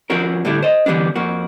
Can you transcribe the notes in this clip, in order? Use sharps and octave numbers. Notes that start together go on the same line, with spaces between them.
F3 C4 D4 F4 F#4 A#4
A2 D3 G3 D4 E4
C5 D#5
D3 E3 G3 B3 D4
F2 A#3 F#4